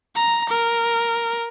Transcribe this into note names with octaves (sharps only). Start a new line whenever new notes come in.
A#5
A#4